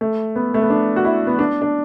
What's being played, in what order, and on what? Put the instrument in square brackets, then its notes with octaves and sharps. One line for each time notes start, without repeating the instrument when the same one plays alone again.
[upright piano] A3
B3
A3
B3
D4
F#4
E4
B3
D4
D4